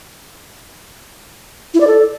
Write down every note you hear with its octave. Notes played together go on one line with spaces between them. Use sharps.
E4
D5
A4